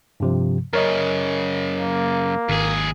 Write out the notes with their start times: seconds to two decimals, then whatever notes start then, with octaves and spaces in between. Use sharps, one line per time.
0.20 G2 C3 F3
0.73 F#2 C#3 A#4 C#5 D#5
1.75 A#3
2.49 G#1 D#2 G#4